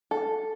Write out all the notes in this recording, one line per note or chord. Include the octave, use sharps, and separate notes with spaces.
A4